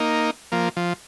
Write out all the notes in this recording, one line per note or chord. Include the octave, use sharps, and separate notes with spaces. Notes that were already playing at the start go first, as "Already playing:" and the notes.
Already playing: A#3 D#4
F3 A#3
F3